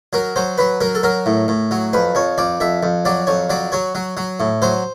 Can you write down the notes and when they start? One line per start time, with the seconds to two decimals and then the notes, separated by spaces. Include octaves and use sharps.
0.13 F#3 A#4
0.36 F#3 C5
0.58 F#3 B4
0.81 F#3 A#4
0.95 A4
1.03 F#3 A#4
1.26 A2
1.48 A2
1.71 F#3
1.93 F2 B4
2.15 F2 C#5
2.38 F2 D5
2.60 F2 E5
2.83 F2
3.05 F#3 D5
3.27 F2 C#5
3.50 F#3 D5
3.72 F#3 C#5
3.95 F#3
4.17 F#3
4.40 A2
4.62 F#3 C5